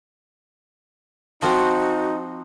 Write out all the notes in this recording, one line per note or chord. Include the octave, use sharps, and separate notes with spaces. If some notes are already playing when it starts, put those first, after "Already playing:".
F3 C4 D#4 F#4